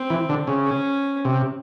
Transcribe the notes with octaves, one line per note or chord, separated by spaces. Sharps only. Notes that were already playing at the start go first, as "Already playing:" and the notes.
Already playing: C4
E3
D3
C#3
C#4
C3